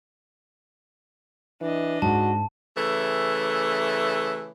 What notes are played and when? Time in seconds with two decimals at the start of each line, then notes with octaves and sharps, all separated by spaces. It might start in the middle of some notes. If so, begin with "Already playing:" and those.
1.62 E3 D4 D#5
2.02 G#2 F#4 A5
2.77 C#3 E3 A3